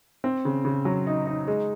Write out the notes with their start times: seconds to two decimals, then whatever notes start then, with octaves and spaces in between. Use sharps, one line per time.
0.24 C4
0.45 C#3
0.65 C#3
0.85 F#3
1.07 D#4
1.27 D#4
1.48 G#3